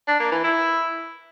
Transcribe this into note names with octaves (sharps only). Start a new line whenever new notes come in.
D4
A#3
E3
E4